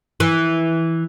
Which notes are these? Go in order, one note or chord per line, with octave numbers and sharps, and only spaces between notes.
E3